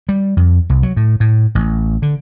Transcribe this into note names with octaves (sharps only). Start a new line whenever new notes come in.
G3
F2
C2
F#3
A2
A2
A1
D3